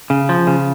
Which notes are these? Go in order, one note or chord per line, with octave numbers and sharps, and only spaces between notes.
C#3
F3
C#3